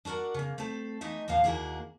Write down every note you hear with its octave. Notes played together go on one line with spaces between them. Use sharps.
D4 F#4 A#4 D5 F#5
C#3 A#3
A3 C4 A4
E3 A3 D#4 D#5 E5
D#2 A2 A#3 F5
D#2 G#2 A#3 E4 F#4 G#4